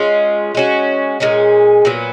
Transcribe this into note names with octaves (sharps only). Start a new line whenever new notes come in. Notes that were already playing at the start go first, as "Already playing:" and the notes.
Already playing: G#3 C#4 F4
G#3 C#4 F#4
A#2 G#3 C#4 G#4
A#2 F#3 B3